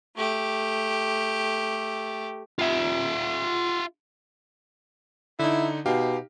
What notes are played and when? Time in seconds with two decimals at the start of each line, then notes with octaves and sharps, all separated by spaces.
0.16 A3 G4
2.59 F4 E5
5.39 D3 D#4 E4
5.86 B2 D#4 G4 F5